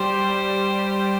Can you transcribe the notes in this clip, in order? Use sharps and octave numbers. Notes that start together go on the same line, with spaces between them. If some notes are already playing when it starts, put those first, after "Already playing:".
Already playing: G3 G4 C5